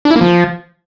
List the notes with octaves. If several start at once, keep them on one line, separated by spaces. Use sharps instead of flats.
D4
E4
A#3
F3